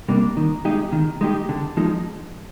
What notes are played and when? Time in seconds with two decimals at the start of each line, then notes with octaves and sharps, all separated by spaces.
0.09 C3 G3 A#3 D4
0.37 D#3
0.65 G#3 D#4 G4
0.93 D#3
1.21 G#3 D#4 G4
1.49 D3
1.77 F3 G#3 D#4